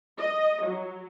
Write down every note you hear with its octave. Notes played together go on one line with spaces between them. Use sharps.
D#5
F#3